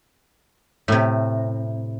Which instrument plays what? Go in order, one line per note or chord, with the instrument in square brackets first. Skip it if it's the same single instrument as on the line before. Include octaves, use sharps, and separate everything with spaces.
[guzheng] A2 C3